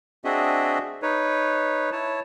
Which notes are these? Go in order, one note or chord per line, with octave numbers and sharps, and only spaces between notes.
C4 D4 F#4 G#4 D#5 E5
D#4 B4 C#5
E4 C#5 A5